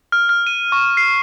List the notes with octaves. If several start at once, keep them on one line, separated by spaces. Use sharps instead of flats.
F6
F6
D#7
C#6
C7